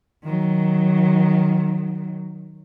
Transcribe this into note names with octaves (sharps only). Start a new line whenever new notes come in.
D#3 F#3